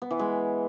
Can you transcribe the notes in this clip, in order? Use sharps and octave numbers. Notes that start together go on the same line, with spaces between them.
B3
E3
G#3